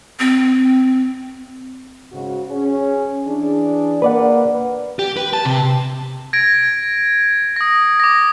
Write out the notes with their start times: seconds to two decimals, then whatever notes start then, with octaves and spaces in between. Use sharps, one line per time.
0.20 C4
2.12 G#2 C#3 F#4
2.49 C#4 G#4
3.26 E3 D4 G#4
4.02 A#3 B4 D5 F#5
4.99 G4
5.17 B4
5.33 A5
5.45 C3
6.33 G#6 A#6 D7
7.56 D#6 A#6
8.00 D6 A#6